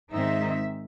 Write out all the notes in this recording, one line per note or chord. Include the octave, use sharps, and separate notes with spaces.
G#2 D#3 G#3 C4 D#4 E5